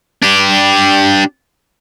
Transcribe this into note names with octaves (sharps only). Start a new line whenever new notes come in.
D4 G4